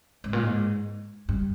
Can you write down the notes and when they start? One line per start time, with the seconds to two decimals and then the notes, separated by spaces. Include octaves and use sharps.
0.24 G#2
0.33 A#2
0.43 G#2
1.29 G2